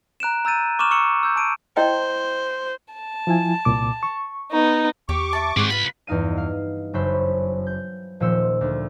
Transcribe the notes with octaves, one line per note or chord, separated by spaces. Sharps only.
A#5 F#6 D7 E7
A#5 E6 G6 A6 D#7
C#6 D6 F6 E7 F#7
C#6 E6 C#7 E7 F#7
E6 G6
A5 D7 D#7
E4 C5 D#5 G5
A5
F3 E4 G#5
C2 A#2 D6
C#6
B3 D#4
E2 G4 C#6 D6
E5 A5
G#2 G#3 C4 G#4 F#5
C2 F4 B4 B5
E2 G2 D#4 F5 D#7
F5
F#1 F#2 F#4 C5 E5 B5
G6
D#1 A#2 F3 C5 E6 C#7
D2